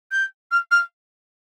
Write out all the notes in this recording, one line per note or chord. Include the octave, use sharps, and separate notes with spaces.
G6
F6
F6